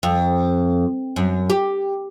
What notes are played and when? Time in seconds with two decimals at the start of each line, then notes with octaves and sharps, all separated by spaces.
0.03 F2
1.16 F#2
1.50 G4